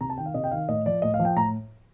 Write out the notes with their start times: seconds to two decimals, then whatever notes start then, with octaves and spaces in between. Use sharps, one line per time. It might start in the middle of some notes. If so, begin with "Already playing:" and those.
0.01 C3 A#5
0.10 A5
0.18 D#3 G5
0.26 F5
0.34 C3 D#5
0.44 G5
0.51 D#3 F5
0.68 A2 D#5
0.86 F3 D5
1.02 A2 D#5
1.14 F5
1.19 F3
1.25 G5
1.36 A2 A#5